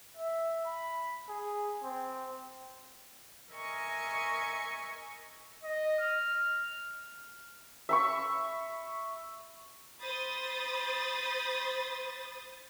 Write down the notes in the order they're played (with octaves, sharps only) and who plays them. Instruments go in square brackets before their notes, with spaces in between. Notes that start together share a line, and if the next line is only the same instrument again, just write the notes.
[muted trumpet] E5
B5
G#4
C4
[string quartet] A#4 D#5 E5 G#5 C#6
[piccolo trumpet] D#5
F6
[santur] E5 B5 C#6
[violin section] C5 B5 D#6 A6